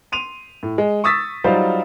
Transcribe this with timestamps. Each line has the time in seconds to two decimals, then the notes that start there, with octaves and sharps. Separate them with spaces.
0.12 C6 D#7 F7
0.63 A2
0.78 G#3
1.04 C#6 D#6 E6 A6 B6
1.44 F#3 G3 D#4 F4 C5 F5